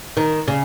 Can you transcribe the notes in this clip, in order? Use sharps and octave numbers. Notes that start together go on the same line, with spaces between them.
D#3
C#3